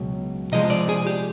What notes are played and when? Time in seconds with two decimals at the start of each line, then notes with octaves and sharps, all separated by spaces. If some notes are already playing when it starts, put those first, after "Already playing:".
Already playing: C#2 B2 F#3
0.52 C3 F3 G#3 D#5
0.70 D5
0.89 G#4
1.07 G4